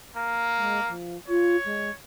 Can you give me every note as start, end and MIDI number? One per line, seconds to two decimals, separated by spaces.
0.17 0.92 58
0.56 0.80 56
0.88 1.17 53
1.28 1.56 65
1.28 1.93 73
1.65 1.90 56